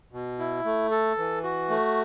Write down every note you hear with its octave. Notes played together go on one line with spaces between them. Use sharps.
B2
E4
A3
A4
E3
F#4
A3